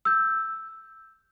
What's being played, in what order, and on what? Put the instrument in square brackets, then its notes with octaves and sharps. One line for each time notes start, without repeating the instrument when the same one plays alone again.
[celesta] E6 G6